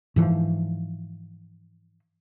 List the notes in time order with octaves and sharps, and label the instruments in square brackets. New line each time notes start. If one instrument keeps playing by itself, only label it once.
[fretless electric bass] G#2 E3 F3